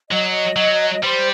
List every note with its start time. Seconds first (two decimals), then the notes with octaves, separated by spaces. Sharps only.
0.10 F#3 D#5
0.56 F#3
1.03 G3 C5